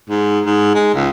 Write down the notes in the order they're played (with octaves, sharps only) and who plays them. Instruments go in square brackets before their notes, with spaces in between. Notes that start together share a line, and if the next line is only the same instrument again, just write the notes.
[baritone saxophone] G#2
G#2
G#3
C#2